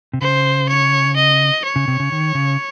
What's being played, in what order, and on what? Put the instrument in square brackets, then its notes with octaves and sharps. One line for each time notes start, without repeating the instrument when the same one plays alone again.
[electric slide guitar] C3
[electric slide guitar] C#3 [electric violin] C5
[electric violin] C#5
D#5
C#5
[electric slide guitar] C#3
C3
C#3
D#3
C#3